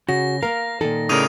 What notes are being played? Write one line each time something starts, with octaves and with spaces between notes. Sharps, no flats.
C#3 F#4 A#6
A#3 A#4 F5
A#2 D#3 A4
A2 C#3 D#4 A#4 D5 D#6 D#7 F7